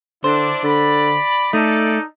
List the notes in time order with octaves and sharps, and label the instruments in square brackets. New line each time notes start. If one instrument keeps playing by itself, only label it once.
[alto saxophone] D3 [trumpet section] D4 E4 D5 [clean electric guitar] C5
[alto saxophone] D3 [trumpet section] D5 B5
[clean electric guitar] A3 [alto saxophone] D#4 [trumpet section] A4 D5